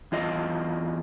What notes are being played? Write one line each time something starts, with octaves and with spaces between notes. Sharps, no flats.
E2 F4 D#5